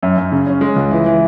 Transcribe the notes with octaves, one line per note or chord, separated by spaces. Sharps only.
F#2
F#2
C#3
C#4
G#3
C#2
E3
E3